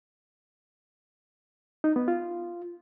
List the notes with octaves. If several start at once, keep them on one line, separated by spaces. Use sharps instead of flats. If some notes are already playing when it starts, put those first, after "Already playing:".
D#4
B3
F4